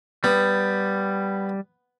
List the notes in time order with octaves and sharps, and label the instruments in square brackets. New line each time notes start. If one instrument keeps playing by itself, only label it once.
[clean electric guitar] G3 [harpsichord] B3